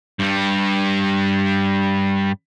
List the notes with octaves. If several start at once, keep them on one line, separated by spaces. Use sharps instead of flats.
G2 G3